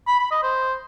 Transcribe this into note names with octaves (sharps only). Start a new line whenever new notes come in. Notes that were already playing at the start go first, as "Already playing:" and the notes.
B5
B5
D#5
C5